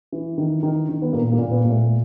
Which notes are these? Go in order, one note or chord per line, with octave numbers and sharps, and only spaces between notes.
E3
D#3
D#3
D#3
B3
A#2 A#3
A#3
A#2
B3
A#2
A3